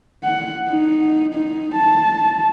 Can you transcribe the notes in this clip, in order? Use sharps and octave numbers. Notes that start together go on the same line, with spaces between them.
F#5
D#4
D#4
A5